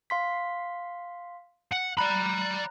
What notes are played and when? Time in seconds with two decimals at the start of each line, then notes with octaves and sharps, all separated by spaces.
0.10 F5 C6 B6
1.72 F#5
1.97 D5 A#5 B5 F#6